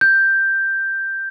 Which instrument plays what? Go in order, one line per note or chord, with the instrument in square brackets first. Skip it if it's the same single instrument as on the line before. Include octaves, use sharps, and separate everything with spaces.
[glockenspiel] G6